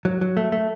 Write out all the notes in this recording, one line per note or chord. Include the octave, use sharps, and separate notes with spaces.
F#3
F#3
A3
A3